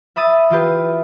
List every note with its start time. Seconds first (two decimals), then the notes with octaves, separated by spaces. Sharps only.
0.16 E5 B5 D#6 A6 D#7
0.50 E3 F4 G4 B4